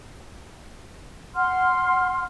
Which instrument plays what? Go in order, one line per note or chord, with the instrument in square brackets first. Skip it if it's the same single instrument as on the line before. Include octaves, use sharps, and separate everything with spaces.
[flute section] F#5 C6 F6